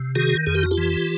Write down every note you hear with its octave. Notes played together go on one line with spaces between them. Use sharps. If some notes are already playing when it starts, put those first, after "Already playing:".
Already playing: C3
D#3 F#4 G#4
F2 G#4
G4
F#4
F4 G4
E3